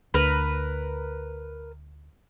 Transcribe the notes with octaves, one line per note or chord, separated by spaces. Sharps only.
D2 A#4 B4